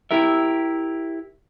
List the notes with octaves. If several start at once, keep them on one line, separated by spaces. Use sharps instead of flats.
E4 G4 A#4 E5